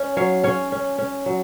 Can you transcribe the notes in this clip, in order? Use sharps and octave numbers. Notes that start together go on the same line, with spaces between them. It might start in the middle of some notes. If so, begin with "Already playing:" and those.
Already playing: C#4
F#3 C#5 F5
C#4 C#5 F5
C#4
C#4
F#3